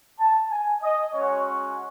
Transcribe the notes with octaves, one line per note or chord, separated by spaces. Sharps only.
A5
G#5
D#5
G#3 C#4 F#4 C#5